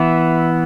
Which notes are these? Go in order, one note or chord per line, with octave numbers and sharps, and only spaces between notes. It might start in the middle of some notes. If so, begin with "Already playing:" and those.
Already playing: E3 B3 E5